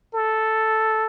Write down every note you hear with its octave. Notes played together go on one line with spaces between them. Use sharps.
A4